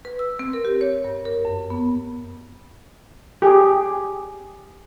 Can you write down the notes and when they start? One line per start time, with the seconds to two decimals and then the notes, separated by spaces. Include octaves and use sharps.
0.05 B4
0.19 E6
0.39 C4
0.53 A#4
0.65 G4
0.81 C#5
1.05 G2
1.25 A#4
1.45 F#2
1.70 B3
3.42 G4 G#4